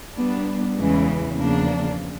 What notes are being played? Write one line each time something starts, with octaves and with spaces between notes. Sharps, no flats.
G3 B3 D4
E2 C#3 E3 G#3
E2 C#3 F3 A#3 D4